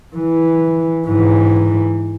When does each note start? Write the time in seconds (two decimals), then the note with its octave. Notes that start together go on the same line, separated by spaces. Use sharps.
0.16 E3
1.07 G#2 E3